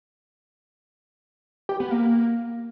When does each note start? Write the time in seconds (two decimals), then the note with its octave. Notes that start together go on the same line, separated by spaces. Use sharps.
1.69 G4
1.80 B3
1.91 A#3